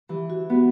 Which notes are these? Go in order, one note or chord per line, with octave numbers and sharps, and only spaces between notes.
E3 G4
F#4
B3 G4